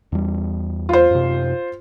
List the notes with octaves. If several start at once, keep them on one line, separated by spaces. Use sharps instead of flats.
E2 G3
F4 C5
F#2 C3